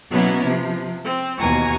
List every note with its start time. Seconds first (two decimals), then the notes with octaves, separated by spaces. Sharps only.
0.11 B2 F#3 A#3 B3 C#4 E4
0.44 C3 F3
1.05 C4
1.40 D#2 B2 E3 G#5 A#5 C#6